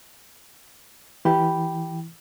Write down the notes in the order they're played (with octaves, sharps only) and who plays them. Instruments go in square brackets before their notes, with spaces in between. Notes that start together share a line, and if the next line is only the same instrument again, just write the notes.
[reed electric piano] E3 [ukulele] G4 B5